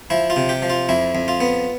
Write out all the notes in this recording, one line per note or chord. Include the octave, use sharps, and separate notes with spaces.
F3 E4
F4
C3
G4
F3
F4
F2 E4
F2
F4
B3